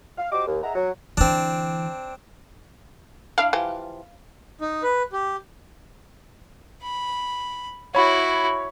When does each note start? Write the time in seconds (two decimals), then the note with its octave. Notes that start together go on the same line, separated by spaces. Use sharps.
0.18 F5
0.32 F#4 G4 C5 D#5 D6
0.47 D#2
0.63 G#4 D#5 E5 F#5 A#5
0.75 F#3
1.17 D3 E3 C4 D4
3.38 D4 E4 F5
3.53 E3 F3 G4
4.61 D#4
4.83 B4
5.13 G4
6.83 B5
7.95 E4 F#4 C#5 B5